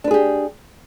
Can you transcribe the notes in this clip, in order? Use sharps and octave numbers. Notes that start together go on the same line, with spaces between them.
D4 G4 G#4 B4